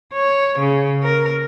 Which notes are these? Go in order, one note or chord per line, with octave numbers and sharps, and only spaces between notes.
C#5
C#3
A#4